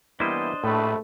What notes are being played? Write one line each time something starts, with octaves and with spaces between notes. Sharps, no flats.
E3 G3 A#3 B3 D4 E4 C5 D#5
A#1 A2 A3 B4